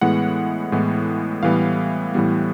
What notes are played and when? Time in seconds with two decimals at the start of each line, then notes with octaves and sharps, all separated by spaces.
0.01 A2 E3 G#3 B3 F#5
0.72 A2 E3 G#3 B3
1.43 A2 E3 G3 B3 F5
2.14 A2 E3 G3 B3